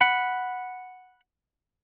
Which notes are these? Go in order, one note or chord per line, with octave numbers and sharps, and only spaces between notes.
F#5 B5